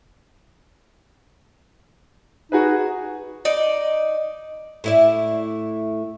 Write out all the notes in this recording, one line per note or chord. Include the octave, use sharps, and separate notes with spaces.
D#4 F#4 G#4 B4
D#4 D5
A2 E4 D5